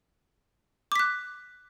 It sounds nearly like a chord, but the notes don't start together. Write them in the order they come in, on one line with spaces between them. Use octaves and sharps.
D6 B6 F#6